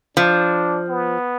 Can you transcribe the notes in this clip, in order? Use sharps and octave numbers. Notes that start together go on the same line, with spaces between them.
F3 D4
B3